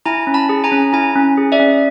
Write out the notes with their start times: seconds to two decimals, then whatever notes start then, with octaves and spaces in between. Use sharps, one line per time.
0.06 E4 G#5 A#5
0.27 C#4
0.34 A5 B5
0.49 G#4
0.64 G#5 A#5
0.72 C#4
0.93 E4 G#5 A#5
1.15 C#4
1.37 G#4
1.52 D5 E5
1.60 C#4